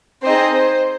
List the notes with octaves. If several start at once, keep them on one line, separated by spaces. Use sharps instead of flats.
C4 D#4 G#4 C5 D#5
C5